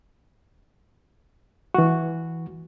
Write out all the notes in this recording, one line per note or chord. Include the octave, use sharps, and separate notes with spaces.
E3 F#4